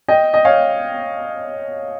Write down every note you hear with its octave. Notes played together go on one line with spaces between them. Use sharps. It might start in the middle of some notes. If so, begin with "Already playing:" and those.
D#5 G5
D#5
C#5 F5